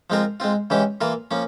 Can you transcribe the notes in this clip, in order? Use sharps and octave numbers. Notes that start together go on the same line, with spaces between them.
F3 G#3 C4 F4 A#4
G#3 C4 F4
C#3 E3 G#3 C#4 G4
E3 A#3 F4 A#4
F3 A#3 C#4